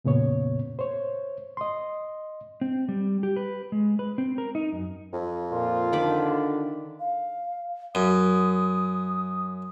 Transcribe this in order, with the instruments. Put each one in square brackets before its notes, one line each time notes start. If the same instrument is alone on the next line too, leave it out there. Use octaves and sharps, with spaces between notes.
[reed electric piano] F2 A#2 C#3 B3 C#5
C5 C#5
D#5 C6
[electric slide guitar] C4
G3
G4
B4
G#3
B4
C4
A#4
D#4
F#2
[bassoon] F2
[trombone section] A#2 [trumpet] F4
[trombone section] D3 [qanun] D#3 B5 D6
[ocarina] F5
[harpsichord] F#2 [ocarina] D#6